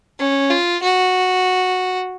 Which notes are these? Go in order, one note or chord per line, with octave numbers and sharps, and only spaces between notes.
C#4
F4
F#4